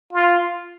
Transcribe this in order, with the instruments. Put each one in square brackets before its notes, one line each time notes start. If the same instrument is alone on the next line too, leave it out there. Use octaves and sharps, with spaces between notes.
[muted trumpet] F4